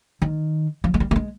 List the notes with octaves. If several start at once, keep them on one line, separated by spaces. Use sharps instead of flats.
D#3
F3
G#3
G3
A#3
G#3